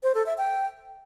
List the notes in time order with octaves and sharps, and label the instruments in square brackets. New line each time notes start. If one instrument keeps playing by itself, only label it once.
[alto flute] C5
A4
E5
G5